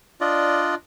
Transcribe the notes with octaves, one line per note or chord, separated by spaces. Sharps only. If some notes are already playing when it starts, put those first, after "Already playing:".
D4 F4 D5 D#5